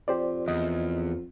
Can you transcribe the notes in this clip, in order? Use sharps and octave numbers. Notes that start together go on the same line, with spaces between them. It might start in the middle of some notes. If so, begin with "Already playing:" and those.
F2 G4 C5 D5
E2 D#5